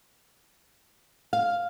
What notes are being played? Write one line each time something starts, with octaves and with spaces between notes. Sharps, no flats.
F5